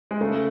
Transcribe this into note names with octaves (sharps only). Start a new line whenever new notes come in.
G#3
C#3 A3